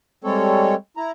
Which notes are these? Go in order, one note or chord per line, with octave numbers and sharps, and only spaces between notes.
G3 G#3 C4 A4 C#5
E4 A#5